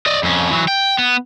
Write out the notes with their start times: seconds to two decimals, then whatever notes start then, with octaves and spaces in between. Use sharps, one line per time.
0.06 D5 D#5
0.23 F2 C#4
0.50 E3 F#3
0.68 G5
0.98 B3